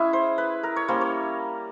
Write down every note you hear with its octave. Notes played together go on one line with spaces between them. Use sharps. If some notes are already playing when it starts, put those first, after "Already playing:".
Already playing: G#3 C#4 E4 G#4
C5
B4
A#4
C#5
G3 A#3 C#4 C5
C#5